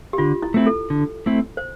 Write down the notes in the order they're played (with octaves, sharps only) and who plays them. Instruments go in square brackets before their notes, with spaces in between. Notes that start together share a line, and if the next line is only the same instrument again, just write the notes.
[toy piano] G4
[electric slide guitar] D3 [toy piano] F4
[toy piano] E4
[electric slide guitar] A3 C4 E4
[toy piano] A4
[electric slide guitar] D3
A3 C4 E4
[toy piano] C5